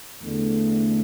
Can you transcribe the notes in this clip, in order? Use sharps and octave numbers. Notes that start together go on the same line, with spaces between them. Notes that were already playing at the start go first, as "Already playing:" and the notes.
E2 D3 A3